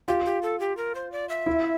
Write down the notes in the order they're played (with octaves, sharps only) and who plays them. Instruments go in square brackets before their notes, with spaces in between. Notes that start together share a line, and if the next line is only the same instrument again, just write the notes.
[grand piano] F4 [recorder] G4
[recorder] G4
A4
G4
A#4
C5
D5
E5
[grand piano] E4